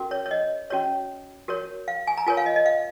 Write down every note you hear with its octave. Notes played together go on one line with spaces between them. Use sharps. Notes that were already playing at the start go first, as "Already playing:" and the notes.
Already playing: C#4 F#4 A#4
C#5
C#5
D#5
C#4 F#4 C#5
F#4 A#4 C#5
F5
G#5
A#5
F4 A#4 C#5 G#5
F5
D#5
D#5
F5